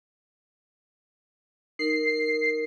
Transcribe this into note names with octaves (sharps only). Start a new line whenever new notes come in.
D#4 A#4 C7